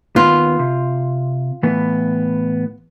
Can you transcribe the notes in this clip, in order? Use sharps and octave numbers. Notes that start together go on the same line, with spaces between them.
D#2 B3 F4
C3
A2 E3 B3